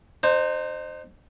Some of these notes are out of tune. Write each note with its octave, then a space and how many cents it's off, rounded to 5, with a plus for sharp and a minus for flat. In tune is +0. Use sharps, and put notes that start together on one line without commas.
D#4 -35 C5 +0